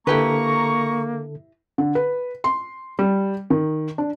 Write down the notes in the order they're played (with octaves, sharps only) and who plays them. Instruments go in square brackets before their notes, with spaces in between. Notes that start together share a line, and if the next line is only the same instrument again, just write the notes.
[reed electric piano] D3 A4 [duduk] A#3 [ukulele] E4 G4 B4 [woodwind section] A#5 C#6
[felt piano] D3
B4
C6
G3
D#3
D4